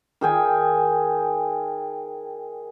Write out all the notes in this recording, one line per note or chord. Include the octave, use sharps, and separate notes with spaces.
D#3 G#4 G5 G#5